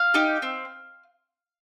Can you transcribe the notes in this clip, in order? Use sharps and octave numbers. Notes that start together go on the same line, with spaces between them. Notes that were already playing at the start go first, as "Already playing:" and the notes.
Already playing: F5
D#4 G4
C4